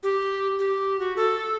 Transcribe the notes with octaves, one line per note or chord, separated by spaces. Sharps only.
G4
G4
F#4
A4